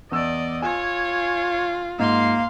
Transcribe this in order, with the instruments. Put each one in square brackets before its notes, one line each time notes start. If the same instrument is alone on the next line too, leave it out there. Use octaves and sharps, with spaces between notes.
[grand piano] E2 E6 [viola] D5 D#5
[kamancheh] F4 [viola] C#5 [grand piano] G#5
[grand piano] G#2 [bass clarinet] A#3 [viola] F5 C6